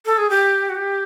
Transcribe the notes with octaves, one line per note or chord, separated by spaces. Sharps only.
A4
G#4
G4
F#4
G4